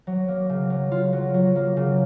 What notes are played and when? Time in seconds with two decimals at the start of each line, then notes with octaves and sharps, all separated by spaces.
0.07 F#3
0.28 A#3
0.49 C#3
0.70 F#3
0.92 F4
1.13 F#3
1.34 F#3
1.56 A#3
1.77 C#3